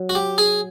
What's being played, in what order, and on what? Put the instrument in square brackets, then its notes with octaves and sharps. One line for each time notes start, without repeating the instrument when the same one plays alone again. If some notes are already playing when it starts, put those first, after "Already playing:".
Already playing: [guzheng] F#3
[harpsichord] F#4
G4
G#4